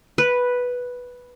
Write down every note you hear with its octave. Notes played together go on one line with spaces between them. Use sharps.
B4